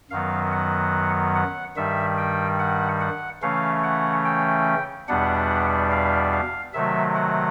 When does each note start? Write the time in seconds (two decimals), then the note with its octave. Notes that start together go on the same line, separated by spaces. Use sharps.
0.11 F#2 D#3 F#3 B3 F5
0.52 F#5
1.35 F#5
1.77 G2 D#3 G3 E5
2.18 G5
2.59 F#5
3.01 F#5
3.42 C#3 E3 A3 C#4 F5
3.84 F#5
4.25 G5
5.08 E2 B2 G3 B3 D4 F#5
5.91 F5
6.33 F5
6.74 C3 D#3 F#3 A3 E5
7.16 F#5